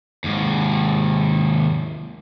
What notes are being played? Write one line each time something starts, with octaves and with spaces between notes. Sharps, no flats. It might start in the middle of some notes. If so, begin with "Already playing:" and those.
D#2 G#2